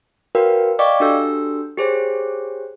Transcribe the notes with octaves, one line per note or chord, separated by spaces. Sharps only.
F#4 A#4 B4 C#5 F5 G5
D5 D#5 F5 G5 C#6 D6
D4 F#4 G4 A4 E6 G6
G4 G#4 C5 C#5